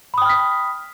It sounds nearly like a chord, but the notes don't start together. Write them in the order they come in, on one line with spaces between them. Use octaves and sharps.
B5 D#6 G5 F6 B6